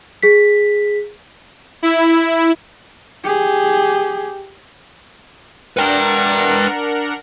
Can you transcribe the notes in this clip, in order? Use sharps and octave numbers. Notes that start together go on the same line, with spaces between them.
G#4 B6
E4
G4 G#4
D4 A#4 B4 F#5 G5